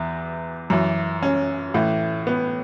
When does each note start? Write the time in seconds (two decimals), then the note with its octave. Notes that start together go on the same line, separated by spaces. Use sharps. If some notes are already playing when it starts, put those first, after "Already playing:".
Already playing: E2 E3 E4
0.70 F#2 E3
1.23 C#4
1.74 A2 E3
2.27 B3